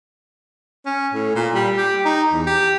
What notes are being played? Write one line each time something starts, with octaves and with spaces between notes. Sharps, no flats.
C#4
A2
A#2
G3
G4
D#4
E2
G4